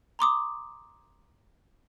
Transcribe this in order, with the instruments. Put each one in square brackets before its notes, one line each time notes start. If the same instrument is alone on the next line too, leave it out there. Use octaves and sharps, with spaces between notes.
[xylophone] A#5 C6 D6 D#6